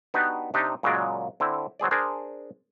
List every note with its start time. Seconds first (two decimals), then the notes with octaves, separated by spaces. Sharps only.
0.14 B3 D4 D#4 F#4 G4 B4
0.54 C3 D4 D#4 G4
0.83 A#2 C#3 F#3 G#3 D5
1.40 D3 C4 E4
1.80 F#3 C4 G#4 D5
1.91 D4 G#4 A#4 C5